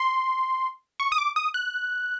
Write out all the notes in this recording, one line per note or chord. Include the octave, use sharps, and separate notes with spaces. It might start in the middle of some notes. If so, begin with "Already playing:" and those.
Already playing: C6
C#6
D#6
D6
D#6
F#6